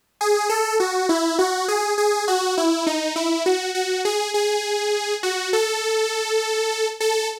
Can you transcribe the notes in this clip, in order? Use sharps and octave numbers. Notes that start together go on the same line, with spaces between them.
G#4
A4
F#4
E4
F#4
G#4
G#4
F#4
E4
D#4
E4
F#4
F#4
G#4
G#4
F#4
A4
A4